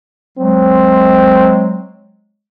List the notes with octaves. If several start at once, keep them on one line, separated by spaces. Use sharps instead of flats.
F#3 G#3 C4